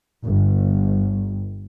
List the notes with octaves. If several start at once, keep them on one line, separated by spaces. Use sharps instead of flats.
G1